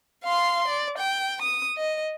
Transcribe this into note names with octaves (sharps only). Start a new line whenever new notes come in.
F5 C6
D5
G5
D#6
D#5